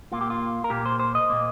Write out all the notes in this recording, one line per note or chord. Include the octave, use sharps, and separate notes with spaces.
A#2 A#3 F4
G4
F4
A#4
A#2 A#3 G4
C5
C5
D#5
A#2 A#3